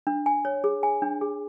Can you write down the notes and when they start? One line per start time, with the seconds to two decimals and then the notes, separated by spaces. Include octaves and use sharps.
0.07 D4
0.26 G#5
0.45 C#5
0.64 G#4
0.83 G#5
1.02 D4
1.21 G#4